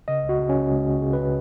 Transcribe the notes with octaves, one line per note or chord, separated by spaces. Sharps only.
C#3 D#5
C#2
F#4
C#3
C#4
C#2
C#2
C#3
C#3
C#3 B4